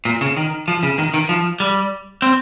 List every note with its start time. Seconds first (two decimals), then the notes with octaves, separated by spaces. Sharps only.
0.05 A#2
0.21 C#3
0.37 D#3
0.68 F3
0.83 C#3
0.99 D#3
1.14 D#3
1.29 F3
1.60 G3
2.22 C4